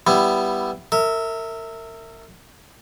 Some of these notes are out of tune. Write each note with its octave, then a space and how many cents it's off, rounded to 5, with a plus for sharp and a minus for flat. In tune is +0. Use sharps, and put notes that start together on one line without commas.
G3 +0 B3 +0 E4 +10
A#4 -35 E5 -15